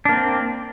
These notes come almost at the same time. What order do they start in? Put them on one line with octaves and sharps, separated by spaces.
D4 A#3 C4